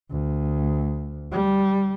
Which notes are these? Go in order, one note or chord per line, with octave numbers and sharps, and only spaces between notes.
D2
G3